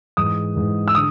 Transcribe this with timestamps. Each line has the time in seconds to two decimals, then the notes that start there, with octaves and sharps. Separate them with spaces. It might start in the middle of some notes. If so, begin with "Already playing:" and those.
0.17 G#2 E3 G#3 D#6
0.56 G#2 E3 G#3
0.88 E6
0.95 D3 D#6